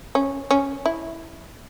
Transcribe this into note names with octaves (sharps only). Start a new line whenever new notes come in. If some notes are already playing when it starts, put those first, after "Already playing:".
C#4
C#4
E4